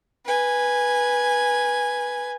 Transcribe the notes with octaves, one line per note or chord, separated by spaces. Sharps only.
B4 G#5